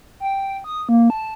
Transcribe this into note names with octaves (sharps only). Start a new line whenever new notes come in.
G5
D#6
A#3
A5